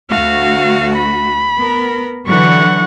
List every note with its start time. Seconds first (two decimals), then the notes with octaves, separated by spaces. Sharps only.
0.10 D2 A3 F#4 F5
0.96 B5
1.59 B3 A#4
2.27 D3 E3 F#3 F#5 C#6